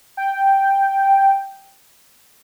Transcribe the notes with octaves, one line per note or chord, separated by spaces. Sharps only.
G5